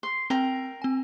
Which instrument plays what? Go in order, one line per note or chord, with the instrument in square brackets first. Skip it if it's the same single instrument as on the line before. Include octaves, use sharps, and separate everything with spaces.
[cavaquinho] C6
[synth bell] C4 [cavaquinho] A#4 G5
[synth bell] C4 G#5